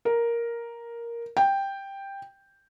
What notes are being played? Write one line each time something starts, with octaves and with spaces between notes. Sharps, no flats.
A#4
G5